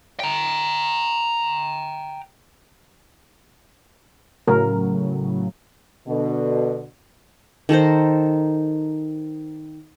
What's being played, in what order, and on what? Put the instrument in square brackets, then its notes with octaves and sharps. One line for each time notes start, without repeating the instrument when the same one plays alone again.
[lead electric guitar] G5 A#5
[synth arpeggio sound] A2 C#3 F#3 [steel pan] A#4
[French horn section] B2 D3
[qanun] D#3 A4 A#4 C5